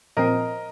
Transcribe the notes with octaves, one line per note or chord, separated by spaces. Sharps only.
A#2 F3 C4 A#4 D#5